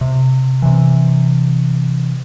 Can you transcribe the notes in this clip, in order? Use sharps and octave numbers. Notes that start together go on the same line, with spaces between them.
C3
C3 E3